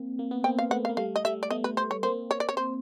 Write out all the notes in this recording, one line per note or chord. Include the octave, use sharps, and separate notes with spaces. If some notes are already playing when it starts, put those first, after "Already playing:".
Already playing: A#3 C4
A#3
B3
A#3 C4 G5
F5
A3 B3 F#5
F5
A#3
G3 A3 F5
D#5
G3 A3 E5
D5
A3 B3 D#5
B4
C5
C#5
A#3 C4 C5
C#5
D5
C#5
C5